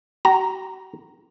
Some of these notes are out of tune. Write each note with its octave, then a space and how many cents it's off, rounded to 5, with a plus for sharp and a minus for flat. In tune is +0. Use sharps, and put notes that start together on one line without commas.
F#4 +45 A#5 +0